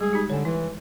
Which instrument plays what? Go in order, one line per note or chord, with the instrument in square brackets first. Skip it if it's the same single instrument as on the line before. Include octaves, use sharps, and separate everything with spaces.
[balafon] G3 G#3 [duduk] G#4
[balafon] D#4 G4
[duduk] D3 [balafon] C#5 G#5
[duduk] E3 [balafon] E4